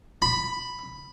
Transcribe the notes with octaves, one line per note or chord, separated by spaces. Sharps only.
B5